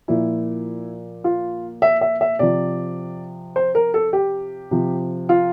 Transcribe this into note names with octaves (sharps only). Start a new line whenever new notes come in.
A#2 F3 E4
F4
E5
E5
E5
C3 F3 D5
C5
A#4
A4
G4
C3 F3
F4